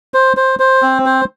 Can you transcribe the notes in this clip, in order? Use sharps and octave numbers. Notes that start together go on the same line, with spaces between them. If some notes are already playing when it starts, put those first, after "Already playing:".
C5
C5
C5
C4
C5